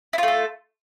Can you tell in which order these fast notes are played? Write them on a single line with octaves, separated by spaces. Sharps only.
E4 F4 A3 A4